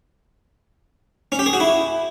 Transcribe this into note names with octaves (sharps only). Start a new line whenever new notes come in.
C#4
G4
G#4
F#4
E4